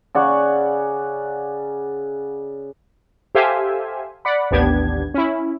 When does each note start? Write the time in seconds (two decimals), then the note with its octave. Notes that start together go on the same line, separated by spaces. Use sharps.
0.15 C#3 D5 F#5 C#6
3.35 G4 A4 C5 E5 F5 G#5
4.25 D5 F#5 B5
4.51 A1 D#2 B3 D4 G4 G#6
5.14 C#4 E4